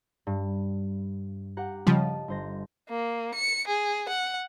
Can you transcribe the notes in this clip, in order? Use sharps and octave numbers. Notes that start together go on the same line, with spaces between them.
G2
G4 F#5 A#5
C#3 F3 G3 D#5 A5
G1 C5 A#6
A#3
C#7
G#4
F#5